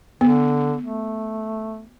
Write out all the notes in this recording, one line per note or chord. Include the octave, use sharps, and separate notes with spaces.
D3 B3
A3